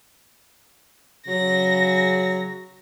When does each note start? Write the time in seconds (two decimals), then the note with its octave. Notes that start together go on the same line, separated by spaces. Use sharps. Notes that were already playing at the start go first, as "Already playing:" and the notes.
1.27 C#3 F#3 A#6